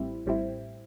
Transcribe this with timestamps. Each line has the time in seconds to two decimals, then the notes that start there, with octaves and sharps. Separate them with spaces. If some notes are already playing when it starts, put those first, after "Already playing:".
Already playing: A1 A2 G3 C4 E4
0.26 A1 A2 G3 C4 E4